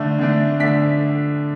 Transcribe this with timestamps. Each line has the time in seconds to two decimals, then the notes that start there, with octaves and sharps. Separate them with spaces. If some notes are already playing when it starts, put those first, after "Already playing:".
Already playing: D3 A3 D4
0.19 D3 A3 D4
0.60 D3 A3 D4 B6